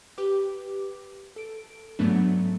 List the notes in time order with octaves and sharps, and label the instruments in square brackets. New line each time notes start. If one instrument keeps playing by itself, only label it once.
[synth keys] G4 B4 D6
A4 D7
G#2 F#3 A3 B3 D4